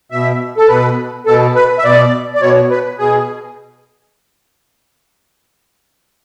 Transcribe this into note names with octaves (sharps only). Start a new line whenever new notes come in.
B2 E5
A4
B2 B4
B2 A4
B4
E5
B2 D5
D5
B2 C#5
B4
B2 G#4